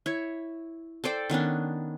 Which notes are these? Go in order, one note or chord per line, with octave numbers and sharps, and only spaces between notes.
E4 C#5
A4 C5 D5 G5
D#3 B3 C#4 D4